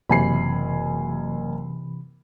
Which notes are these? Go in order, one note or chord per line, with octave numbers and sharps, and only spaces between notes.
F#1 C3 E3 G#5 B5 C7